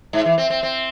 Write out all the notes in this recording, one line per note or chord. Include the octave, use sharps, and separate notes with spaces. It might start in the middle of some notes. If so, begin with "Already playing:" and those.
G#2
E3
C4
C4
C4